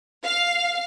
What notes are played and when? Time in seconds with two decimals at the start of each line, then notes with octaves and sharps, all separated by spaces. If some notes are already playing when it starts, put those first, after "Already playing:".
0.23 F5